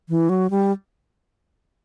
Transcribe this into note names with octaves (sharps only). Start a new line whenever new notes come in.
E3
F#3
G3